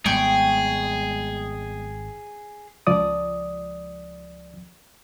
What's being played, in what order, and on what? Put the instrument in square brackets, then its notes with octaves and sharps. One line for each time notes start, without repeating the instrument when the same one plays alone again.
[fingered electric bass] G#1 [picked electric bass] G3 G#3 B3 [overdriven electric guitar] G#4 [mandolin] G5 C#6
[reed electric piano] C#2 F3 D5 D#6